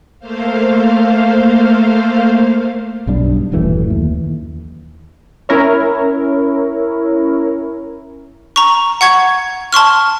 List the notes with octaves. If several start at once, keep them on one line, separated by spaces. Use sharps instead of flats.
A3 A#3 C5 F5
B1 G2 D4
D#1 F#2 E3 A3
D#2
C#4 E4 A#4 C#5
A#5 C#6
F#5 C#6 G#6
A5 C6 C#6 F6